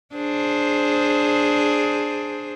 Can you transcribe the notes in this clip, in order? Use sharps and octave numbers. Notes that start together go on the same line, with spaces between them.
D4 G#4 C5